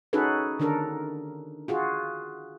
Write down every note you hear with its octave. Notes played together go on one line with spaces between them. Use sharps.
C#4 D#4 F#4 G#4 A4 B4
D3 D#3 D4 A4 A#4
F4 F#4 G#4